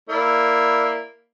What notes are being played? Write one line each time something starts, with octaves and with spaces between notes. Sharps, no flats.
A#3 E4 D5